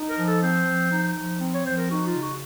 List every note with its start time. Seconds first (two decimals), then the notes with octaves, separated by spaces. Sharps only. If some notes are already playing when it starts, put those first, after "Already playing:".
Already playing: D#4
0.09 A#4
0.17 F3
0.25 A4
0.42 C4 C5
0.67 F3
0.91 D#4
1.16 F3
1.40 C4
1.53 C#5
1.65 F3 C5
1.78 A#4
1.90 D#4 F#4
2.06 F4
2.15 C#3
2.23 F#4